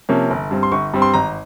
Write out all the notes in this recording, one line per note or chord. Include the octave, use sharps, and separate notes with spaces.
C3 F3 A#3 C#4
G1
G2 G3 C4
C6
G1 C#6
G2 G3 C4
C6
G#1 A#5